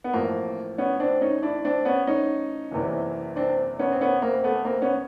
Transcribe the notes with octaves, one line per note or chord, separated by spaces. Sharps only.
B3
A1 A2 F3 A#3 C4
B3 C#4
C4 D4
C#4 D#4
D4 E4
C4 D4
B3 C#4
C#4 D#4
F#1 E2 C3 E3
C4 D4
B3 C#4
C4
B3 C#4
A#3 C4
A3 B3
A#3 C4
B3 C#4